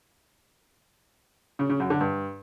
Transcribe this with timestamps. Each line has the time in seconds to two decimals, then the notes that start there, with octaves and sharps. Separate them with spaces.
1.59 C#3
1.70 C#3
1.80 F#2
1.90 D3
2.01 G2